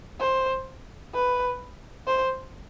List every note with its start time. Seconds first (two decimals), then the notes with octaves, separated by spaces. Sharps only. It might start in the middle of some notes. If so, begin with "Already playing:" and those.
0.20 C5
1.14 B4
2.07 C5